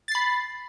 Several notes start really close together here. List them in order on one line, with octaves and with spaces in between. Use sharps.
A6 C7 B5